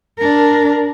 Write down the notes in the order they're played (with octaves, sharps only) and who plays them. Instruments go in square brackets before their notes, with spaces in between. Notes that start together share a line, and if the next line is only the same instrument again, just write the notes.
[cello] D4 A#4